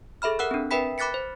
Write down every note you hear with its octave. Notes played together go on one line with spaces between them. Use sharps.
G#4 A4 E5 B5 F6
A#4 F#5 E6 F#6
C4 D4
A#4 B4 E5 G5 B5 B6
B5 D6 F#6 A6 B6 C#7
C5